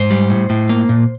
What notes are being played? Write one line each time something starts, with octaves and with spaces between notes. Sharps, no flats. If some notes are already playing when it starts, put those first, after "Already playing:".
Already playing: G#2 C5
G3
A2
A2
A#3
A#2